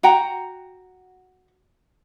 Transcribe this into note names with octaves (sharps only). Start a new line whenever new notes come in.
F#4 F#5 G5 A#5